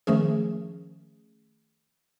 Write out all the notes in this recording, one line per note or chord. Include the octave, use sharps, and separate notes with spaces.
D#3 F3 A3 C#4 G#4